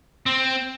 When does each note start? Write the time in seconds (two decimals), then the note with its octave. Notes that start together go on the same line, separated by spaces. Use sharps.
0.26 C4